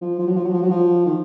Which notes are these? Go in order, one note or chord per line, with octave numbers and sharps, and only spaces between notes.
F3
F3
F#3
F3
F#3
F3
F#3
F3
D#3